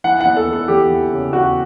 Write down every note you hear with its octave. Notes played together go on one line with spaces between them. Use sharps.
E3 F#5
E2 F#5
A4
E3
A4
E2 G4
E3
C#3
E2 F#4